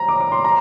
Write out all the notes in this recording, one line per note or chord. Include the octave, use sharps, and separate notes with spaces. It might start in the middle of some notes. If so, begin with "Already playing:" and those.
Already playing: A#5
D6
D6
C6
A#5